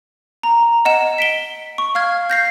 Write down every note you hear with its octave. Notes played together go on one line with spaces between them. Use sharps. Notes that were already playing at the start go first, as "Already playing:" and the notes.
A#5
D#5 F#5 E7
B6 D7 G7
C#6
F5 F6 G#6
G6 A#6 C7